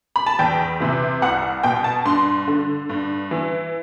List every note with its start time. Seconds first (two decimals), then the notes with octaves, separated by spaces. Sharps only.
0.16 B5
0.26 A5
0.39 E2 G5
0.80 C3 E3
1.22 C2 F#5
1.63 B2 G5
1.84 A5
2.05 G2 C6
2.48 D3
2.89 G2
3.31 E3